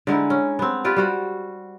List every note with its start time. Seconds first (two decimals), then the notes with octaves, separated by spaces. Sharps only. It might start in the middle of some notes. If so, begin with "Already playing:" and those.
0.07 D3 G#3 D#4 E4
0.30 C#4
0.59 B3 C4
0.84 F4 G4 B4 D5
0.96 G3 F#4 C5